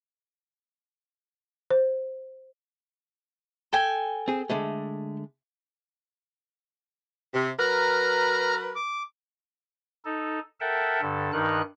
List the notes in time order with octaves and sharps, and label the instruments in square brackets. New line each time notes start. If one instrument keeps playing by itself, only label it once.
[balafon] C5
[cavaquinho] A4 G5 G#5
[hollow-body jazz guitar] C4 G#4
D3 G#3 A3
[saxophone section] C3
[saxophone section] F#3 A#4 B4 [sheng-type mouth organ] A#5 F6
[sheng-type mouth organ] D6
[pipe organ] D#4 A4
A4 A#4 E5 F#5 G5 A5
G2 D3 A4
G2 D#3 D#4 A#4 F#6